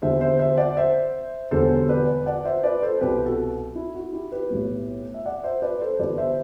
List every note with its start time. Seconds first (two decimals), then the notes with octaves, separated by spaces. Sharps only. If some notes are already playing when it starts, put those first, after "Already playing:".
0.02 E2 D3 G3 C5 E5
0.20 C5 E5
0.39 C5 E5
0.58 D5 F#5
0.77 C5 E5
1.51 E1 E2 D3 G3 A4 C5
1.89 B4 D5
2.26 D5 F#5
2.45 C5 E5
2.64 B4 D5
2.83 A4 C5
3.01 C2 B2 G3 G4 B4
3.26 F#4 A4
3.75 E4
3.95 F#4
4.13 E4 G4
4.31 G4 B4
4.50 B1 A2 G3
5.14 E5
5.26 D5 F#5
5.44 C5 E5
5.62 B4 D5
5.81 A4 C5
5.99 G1 G2 E3 G3 B4 D5
6.18 C5 E5